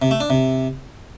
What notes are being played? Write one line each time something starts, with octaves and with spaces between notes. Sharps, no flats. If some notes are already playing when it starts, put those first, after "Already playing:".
C3
A3
D4
C3